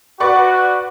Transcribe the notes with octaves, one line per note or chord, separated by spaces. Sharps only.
F#4 B4 D5 C#6